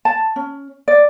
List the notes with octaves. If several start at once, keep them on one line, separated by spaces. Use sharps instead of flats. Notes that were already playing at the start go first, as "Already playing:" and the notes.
A5
C#4
D5